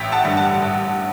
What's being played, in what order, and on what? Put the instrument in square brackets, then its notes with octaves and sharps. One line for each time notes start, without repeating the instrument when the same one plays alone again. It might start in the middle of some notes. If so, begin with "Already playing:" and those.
Already playing: [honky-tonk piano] A1 E5 G5
F#5 A5
G2 D3 G3
F#5 A5
A1